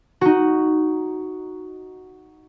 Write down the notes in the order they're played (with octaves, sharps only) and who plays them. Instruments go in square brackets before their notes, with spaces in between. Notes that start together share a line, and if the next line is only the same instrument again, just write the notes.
[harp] D#4 F#4